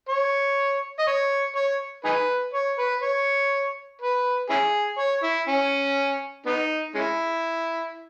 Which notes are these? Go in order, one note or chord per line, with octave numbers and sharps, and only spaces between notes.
C#5
D#5
C#5
C#5
D#4 G#4 B4
C#5
B4
C#5
B4
C#4 E4 G#4
C#5
E4
C#4
B3 D#4
G#3 C#4 E4